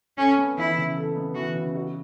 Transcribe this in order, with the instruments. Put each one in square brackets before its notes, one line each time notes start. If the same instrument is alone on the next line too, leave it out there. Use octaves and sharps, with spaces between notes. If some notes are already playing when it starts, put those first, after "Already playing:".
[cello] C#4 [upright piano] A4
[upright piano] B3
[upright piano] E3 [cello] E4
[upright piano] C#3
A4
B3
[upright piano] E3 [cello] F#4
[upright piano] C#3
F#4